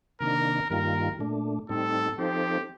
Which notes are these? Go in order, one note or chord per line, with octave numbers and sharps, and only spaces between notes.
C3 D#3 A#3 D4 A#4
G2 D#3 G3 A#3 F4 A#4
A#2 A3 D4
A2 G3 C4 D#4 A4
F3 C4 D#4 G4 A4 C5